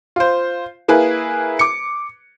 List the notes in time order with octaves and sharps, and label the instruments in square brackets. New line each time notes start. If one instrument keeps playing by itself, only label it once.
[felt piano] F4 C5
A#3 E4 G#4 B4
D6 C#7